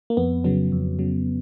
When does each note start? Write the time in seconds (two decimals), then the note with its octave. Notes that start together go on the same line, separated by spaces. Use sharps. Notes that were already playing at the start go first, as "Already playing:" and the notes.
0.10 A#3
0.17 F2 B3
0.44 C#3 F#3 B3
0.72 F2
0.99 C#3 F#3